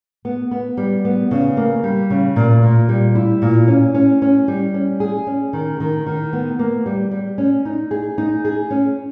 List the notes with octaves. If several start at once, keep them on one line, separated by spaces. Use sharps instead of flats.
B3
B3
G3
B3
C#3
A#3
G3
C#3
A#2
A#2
G3
E4
A#2
C#4
C#4
C#4
G3
C#4
G#4
C#4
D#3
D#3
D#3
B3
A#3
G3
G3
C#4
D#4
G#4
D#4
G#4
C#4